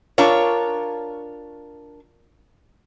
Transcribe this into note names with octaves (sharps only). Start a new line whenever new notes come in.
D4 F4 A#4 C#5